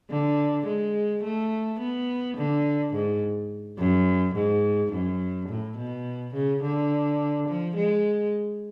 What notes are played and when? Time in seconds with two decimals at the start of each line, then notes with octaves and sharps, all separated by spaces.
0.10 D3
0.66 G#3
1.23 A3
1.79 B3
2.37 D3
2.93 G#2
3.78 F#2
4.35 G#2
4.92 F#2
5.48 A2
5.77 B2
6.34 C#3
6.62 D3
7.48 F3
7.76 G#3